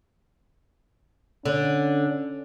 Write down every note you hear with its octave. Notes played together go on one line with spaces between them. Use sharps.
D3 C#4